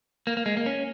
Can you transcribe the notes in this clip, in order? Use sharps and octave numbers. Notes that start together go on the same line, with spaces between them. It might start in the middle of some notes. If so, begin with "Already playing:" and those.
A#3
A#3
G#3
A#3
C#4